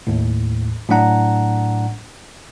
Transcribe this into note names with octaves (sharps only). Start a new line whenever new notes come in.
D#2 A2
A2 F#3 D4 F#5 A#5